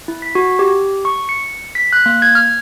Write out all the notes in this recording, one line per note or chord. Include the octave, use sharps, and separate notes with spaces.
E4
B6
F#4
G4
C#6
C#7
B6
F#6
A#3
G#6
F6